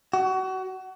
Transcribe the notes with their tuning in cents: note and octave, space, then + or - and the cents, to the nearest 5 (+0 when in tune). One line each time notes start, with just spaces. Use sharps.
F#4 +30